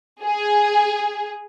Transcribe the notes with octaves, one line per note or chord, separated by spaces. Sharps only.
G#4